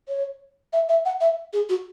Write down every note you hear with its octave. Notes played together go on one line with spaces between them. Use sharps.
C#5
E5
E5
F#5
E5
G#4
F#4